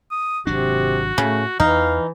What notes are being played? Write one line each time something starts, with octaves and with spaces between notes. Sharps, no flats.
D#6
G#1 C3 F#3 D4 F#4
A2 C#3 A3
E2 E3 D#4 F5